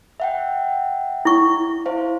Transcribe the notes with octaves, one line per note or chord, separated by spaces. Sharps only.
E5 F#5 G5
E4 C#6
E4 C5 F5